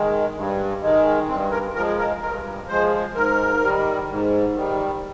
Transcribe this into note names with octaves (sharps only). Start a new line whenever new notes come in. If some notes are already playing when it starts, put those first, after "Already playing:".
Already playing: D#3 G#3
G2
D#3 G#3
G2 C4
A#4
F3 G#3 A#4
A#4
G2 A#4
F3 G#3 C5
G#2 A#4
D#3 G3
G#2
D#3 G3